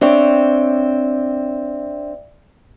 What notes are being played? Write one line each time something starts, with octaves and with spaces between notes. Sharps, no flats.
C4 D4 C#5 D5 E5 G5